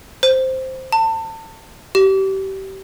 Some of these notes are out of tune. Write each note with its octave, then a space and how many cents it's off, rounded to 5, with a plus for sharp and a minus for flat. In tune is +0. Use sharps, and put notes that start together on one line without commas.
C5 +0
A5 +30
G4 -30